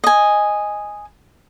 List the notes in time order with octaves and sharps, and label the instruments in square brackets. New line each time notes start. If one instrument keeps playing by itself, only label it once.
[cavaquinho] D#5 G#5